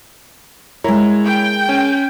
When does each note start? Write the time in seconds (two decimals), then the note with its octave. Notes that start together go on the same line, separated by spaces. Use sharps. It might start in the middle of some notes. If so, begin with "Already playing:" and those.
0.84 G#3 E4 A#4 C#5
1.25 G5
1.69 C#4